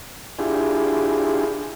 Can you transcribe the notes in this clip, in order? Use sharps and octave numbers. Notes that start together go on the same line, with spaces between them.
D4 E4 F4 G4 G#4